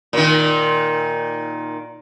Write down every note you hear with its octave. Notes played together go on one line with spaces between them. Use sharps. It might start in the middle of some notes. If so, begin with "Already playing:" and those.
A#2 D#3